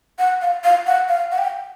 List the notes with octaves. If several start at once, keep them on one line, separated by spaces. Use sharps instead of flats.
F#5
F5
F5
F#5
F5
F#5
G5